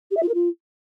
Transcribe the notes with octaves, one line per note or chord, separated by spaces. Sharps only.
G4
E5
F4
A#4
F4